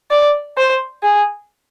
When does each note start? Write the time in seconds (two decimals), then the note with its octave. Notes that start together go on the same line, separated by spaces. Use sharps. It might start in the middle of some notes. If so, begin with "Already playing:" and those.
0.11 D5
0.57 C5
1.03 G#4